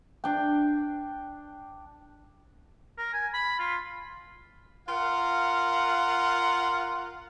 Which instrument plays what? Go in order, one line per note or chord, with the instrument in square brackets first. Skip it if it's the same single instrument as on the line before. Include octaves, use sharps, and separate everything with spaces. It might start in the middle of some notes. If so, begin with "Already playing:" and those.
[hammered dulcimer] D4 G5
[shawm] A#4
G#5
B5
F4
[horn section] F4 A#4 F5 F#5